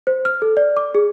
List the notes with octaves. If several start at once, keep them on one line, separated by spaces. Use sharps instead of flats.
C5
F6
A4
D5
D6
G#4